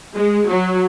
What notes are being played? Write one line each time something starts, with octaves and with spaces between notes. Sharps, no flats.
G#3
F#3